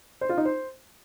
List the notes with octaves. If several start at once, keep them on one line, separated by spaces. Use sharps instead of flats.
C5
F4
D#4
C5